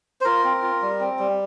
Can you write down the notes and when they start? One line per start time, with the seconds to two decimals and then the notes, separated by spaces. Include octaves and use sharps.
0.21 C5
0.25 F4 A#4
0.44 C4
0.62 F4
0.82 G3
1.00 C4
1.19 G3